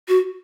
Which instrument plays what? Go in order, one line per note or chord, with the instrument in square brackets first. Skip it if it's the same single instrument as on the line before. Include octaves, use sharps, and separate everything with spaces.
[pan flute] F#4